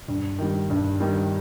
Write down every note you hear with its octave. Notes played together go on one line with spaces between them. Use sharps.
G2
D#3 G3
G2
D#3 G3